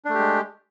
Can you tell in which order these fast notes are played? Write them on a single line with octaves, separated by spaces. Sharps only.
D4 A3 G4 G#3